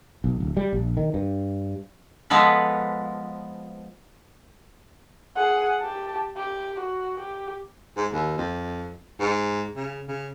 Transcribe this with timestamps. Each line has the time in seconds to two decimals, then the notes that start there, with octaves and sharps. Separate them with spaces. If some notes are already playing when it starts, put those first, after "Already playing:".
0.24 B1
0.40 D1
0.57 G3
0.73 A#1
0.97 D#3
1.14 G2
2.30 F3 G#3 B3 A4 B4
5.36 G#4 F#5
5.81 G4 A5
6.36 G4
6.79 F#4
7.20 G4
7.97 G#2
8.12 D#2
8.38 F2
9.20 G#2
9.76 C#3
10.08 C#3